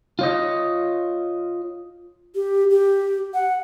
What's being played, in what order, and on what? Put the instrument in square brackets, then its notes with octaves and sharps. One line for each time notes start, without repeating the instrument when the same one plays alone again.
[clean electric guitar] F4 C#5 D#5
[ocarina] G4
G4
F#5